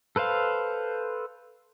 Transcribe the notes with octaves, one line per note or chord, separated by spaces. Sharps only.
A4 B4 C5 F5